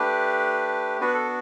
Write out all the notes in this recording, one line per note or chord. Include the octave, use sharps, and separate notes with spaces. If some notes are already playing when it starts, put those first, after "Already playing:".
Already playing: A3 D4 G4 B4
B3 D4 F#4 B4
A4